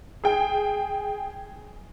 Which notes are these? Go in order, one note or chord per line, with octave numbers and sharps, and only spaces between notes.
G#4 G5